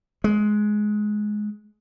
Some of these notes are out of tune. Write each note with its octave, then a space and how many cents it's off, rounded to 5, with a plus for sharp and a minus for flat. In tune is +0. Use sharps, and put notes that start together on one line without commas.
G#3 +15